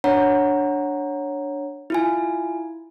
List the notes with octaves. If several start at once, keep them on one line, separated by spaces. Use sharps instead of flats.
D4 C#5 F#5 A#5
E4 F4 G#5